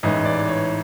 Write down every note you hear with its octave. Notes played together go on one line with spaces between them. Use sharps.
A1 G#2 E3 D#5
D5
C#5